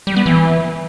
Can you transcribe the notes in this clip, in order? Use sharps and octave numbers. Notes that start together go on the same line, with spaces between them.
G3
B3
E3